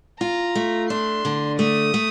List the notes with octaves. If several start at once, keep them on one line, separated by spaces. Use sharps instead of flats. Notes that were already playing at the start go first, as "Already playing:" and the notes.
F4 A#5
A3
D4 C6
D3
A3 D#6
A3